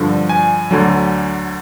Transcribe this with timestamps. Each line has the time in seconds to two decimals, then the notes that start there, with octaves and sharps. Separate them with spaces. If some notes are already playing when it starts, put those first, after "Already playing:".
Already playing: G2 D3 F3
0.29 G#5
0.71 D2 D3 F#3